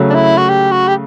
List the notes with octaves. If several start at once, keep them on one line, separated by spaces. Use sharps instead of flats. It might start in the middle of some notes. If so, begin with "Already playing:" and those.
Already playing: C#3 F#3 A3
D4
E4
F#4
G4
F#4
G4